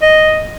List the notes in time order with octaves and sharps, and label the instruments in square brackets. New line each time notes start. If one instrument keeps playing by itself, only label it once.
[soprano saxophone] D#5